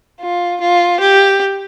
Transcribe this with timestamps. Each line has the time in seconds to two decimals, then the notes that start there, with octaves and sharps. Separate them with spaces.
0.21 F4
0.61 F4
1.00 G4